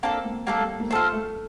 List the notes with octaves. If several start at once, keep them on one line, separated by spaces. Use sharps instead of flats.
A#3 C4 D4 A4
A#3
G3 A#3 D4 A4
A3
A#3
A3 F4 A4 C5
A3